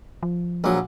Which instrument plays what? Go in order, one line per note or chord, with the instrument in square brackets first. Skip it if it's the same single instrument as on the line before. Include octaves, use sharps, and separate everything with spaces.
[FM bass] F3
[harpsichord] A#1 F#3